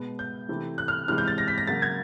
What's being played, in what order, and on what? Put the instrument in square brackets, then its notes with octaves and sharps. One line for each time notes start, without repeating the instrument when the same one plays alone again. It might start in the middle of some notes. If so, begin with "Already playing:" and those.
Already playing: [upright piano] B2 G#3 B3
G6
C3 E3 A3 C4
F#6
F6
C3 E3 G#3 C4 F6
G6
A6
A#6
B6
A#6
C#3 F#3 A#3 A6
G#6